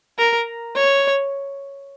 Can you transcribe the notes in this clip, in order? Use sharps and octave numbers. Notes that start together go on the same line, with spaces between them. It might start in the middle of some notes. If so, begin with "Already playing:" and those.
A#4
C#5